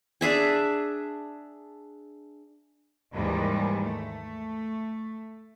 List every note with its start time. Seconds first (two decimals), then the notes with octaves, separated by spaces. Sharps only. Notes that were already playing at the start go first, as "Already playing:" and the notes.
0.21 D4 G#4 E5 G#5
3.13 D#2 G#2 D#3 E3 G3
3.82 A3